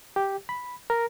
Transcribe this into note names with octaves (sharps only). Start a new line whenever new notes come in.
G4
B5
A#4